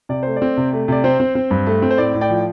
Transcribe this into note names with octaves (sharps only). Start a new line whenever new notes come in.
C3 D5
A3 C5
D5
C4
C3
A3
C3 D5
C4 C5
C4
C4
G2
A3
C4
C5
A2 D5
A2
D5 G5
F3